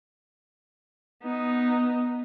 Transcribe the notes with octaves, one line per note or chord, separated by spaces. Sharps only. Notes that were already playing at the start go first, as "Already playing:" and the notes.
B3 D#4